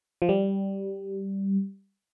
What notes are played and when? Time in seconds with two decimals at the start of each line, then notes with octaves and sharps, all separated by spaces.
0.22 F3
0.29 G3